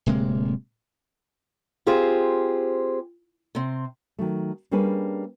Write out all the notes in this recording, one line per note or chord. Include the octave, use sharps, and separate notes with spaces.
D1 C3 G#3 A#3
C4 F4 G4 G#4 C5
C3 C4
D#3 F#3 A3
G3 A#3 C#4 D4 G#4 B4